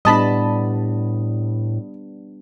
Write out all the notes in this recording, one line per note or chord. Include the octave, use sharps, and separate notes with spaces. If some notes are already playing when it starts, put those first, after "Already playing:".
A2 G3 B3 D4 D#5 A5 B5